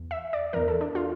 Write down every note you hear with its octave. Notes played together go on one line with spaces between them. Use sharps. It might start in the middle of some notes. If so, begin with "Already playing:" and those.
Already playing: E2
E5
D5
E2 E3 A#4
A4
D4
F4